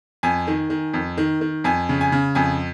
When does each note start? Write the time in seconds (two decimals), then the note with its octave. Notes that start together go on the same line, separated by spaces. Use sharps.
0.23 F2 G#5
0.47 D#3
0.70 D#3
0.94 F2
1.17 D#3
1.41 D#3
1.64 F2 G#5
1.89 C#3
2.01 G#5
2.12 C#3
2.35 F2 G#5